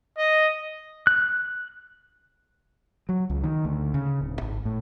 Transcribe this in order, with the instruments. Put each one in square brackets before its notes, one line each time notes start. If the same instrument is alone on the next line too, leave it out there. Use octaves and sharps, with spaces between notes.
[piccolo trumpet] D#5
[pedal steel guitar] F#6
[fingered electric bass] F#3
C#2
D#3
D2
C#3
D1
G#1
A2